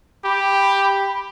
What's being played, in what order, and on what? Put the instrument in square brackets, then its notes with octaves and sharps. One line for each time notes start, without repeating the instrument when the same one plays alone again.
[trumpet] G4 [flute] B5